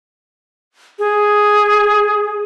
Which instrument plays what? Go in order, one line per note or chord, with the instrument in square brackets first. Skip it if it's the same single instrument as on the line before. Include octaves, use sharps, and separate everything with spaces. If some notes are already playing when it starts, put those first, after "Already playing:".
[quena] G#4